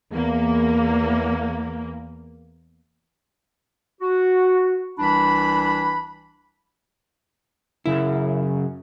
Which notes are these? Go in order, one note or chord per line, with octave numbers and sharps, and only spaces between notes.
E2 A#3
F#4
C2 E3 D4 B5
F#2 C#3 E4